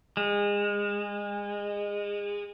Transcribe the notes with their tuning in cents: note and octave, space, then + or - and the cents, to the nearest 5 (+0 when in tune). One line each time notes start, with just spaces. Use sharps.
G#3 -25